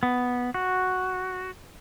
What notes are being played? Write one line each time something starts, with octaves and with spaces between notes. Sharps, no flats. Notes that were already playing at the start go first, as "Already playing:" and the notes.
B3
F#4